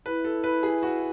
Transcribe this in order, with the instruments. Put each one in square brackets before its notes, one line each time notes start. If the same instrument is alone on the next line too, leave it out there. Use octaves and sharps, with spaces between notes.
[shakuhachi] E4 [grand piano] B4
[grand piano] A4
B4
G#4
F#4